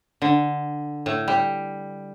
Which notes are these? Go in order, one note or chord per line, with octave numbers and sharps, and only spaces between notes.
D3
A2
G3